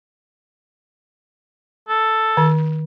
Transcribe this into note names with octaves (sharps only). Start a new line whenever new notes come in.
A4
D#3